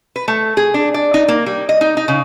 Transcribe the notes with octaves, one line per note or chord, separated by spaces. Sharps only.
B4
A3
G#4
D4
D5
D#4
A#3
G3
D#5
D#4
D#4
C#3